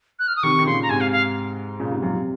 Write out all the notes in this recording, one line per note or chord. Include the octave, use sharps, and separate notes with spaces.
F#6
F6
D#6
C3 D#3 C#6
D#3
A#2 C#3 C6
A#5
G#2 C3 G#5
F5
F5
A#2 C#3
G#2 C3
F#2 A#2
C3